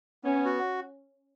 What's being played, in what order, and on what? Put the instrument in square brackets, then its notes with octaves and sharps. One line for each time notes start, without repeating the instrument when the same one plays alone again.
[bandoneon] B3 [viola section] C#4
[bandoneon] F#4